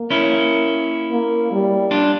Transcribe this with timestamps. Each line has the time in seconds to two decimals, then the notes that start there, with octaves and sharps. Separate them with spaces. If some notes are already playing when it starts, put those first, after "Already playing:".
Already playing: A#3
0.10 C#4 E4
1.11 A#3
1.52 G3
1.91 D4 F4